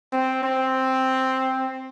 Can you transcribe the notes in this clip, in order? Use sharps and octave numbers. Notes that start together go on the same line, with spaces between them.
C4
C4